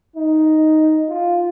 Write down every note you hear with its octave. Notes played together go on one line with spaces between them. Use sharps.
D#4
F4